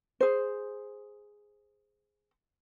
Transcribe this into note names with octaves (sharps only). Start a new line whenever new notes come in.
G#4 C5